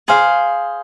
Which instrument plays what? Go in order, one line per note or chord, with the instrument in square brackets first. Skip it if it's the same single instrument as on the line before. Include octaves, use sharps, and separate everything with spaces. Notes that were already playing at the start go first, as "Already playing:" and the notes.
[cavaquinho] G#4 C5 F5